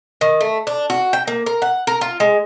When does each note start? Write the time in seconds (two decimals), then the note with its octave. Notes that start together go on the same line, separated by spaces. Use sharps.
0.21 D#3
0.41 A3
0.67 D4
0.90 F#4
1.13 G5
1.27 A#3
1.46 A#4
1.62 F#5
1.87 A#4
2.01 F4
2.20 G#3